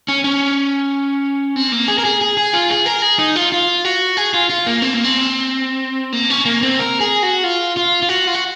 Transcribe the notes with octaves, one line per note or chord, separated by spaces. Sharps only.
C#4
C#4
C4
A#3
G#4
A#4
G#4
G#4
G#4
F4
G#4
A#4
G#4
D#4
F4
F4
F#4
G#4
F4
F4
A#3
C4
A#3
C4
A#3
C#4
A#3
C4
A#4
G#4
F#4
F4
F4
F4
F#4
F4
F#4